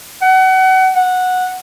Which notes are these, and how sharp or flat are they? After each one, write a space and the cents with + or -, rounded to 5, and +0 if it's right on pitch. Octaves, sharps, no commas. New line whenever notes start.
F#5 +30
F#5 -10